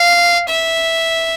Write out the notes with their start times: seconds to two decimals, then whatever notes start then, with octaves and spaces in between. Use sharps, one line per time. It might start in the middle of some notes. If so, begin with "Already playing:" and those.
Already playing: F5
0.49 E5